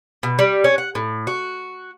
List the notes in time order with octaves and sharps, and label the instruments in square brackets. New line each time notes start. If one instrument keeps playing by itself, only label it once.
[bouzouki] B2
G3
C#4
F#5
A2
F#4